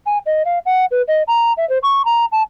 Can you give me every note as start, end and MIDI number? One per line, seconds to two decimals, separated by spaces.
0.06 0.18 80
0.26 0.43 75
0.45 0.59 77
0.66 0.85 78
0.91 1.02 71
1.08 1.23 75
1.27 1.53 82
1.57 1.67 76
1.69 1.78 72
1.83 2.05 85
2.05 2.25 82
2.32 2.43 81